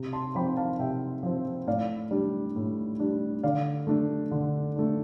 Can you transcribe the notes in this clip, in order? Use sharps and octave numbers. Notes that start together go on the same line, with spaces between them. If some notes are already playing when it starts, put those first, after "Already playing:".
Already playing: C3
A5 C6
F3 C4 G5 B5
F5 A5
C3 E5 G5
F3 C4
A2 D5 F5
G3 D4
A2
G3 D4
D3 D5 F5
A3 D4
D3
A3 D4